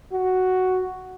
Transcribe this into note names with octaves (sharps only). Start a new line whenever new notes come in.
F#4